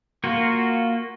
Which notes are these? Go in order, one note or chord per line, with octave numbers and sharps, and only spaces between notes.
A#3 F4 F#4